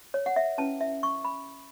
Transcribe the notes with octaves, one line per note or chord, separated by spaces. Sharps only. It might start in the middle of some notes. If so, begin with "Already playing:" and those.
C#5
F#5
E5
C#4 E4 B4 A5
E5
C#6
B5